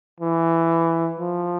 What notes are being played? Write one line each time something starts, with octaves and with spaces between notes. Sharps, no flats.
E3
F3